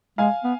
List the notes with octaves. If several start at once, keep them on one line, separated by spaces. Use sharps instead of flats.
G#3 F5 G#5
B3